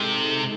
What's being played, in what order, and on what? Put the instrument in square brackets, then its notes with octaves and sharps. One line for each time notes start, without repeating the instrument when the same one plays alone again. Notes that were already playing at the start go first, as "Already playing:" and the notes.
Already playing: [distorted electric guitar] C3 [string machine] G#3 D#4 A4